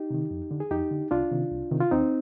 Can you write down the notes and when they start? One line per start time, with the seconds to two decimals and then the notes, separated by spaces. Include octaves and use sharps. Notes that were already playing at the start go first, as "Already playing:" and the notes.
Already playing: D#4 G4
0.10 C3 D#3
0.31 F2
0.51 D3
0.60 G#4
0.71 F2 D#4 G4
0.91 D3
1.11 C2 D4 F4
1.31 C3 D#3
1.51 C2
1.71 C3 D#3
1.81 F4
1.91 D#2 C4 D#4